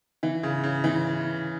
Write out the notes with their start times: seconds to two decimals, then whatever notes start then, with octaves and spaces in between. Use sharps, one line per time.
0.23 E3
0.43 C#3
0.63 C#3
0.84 E3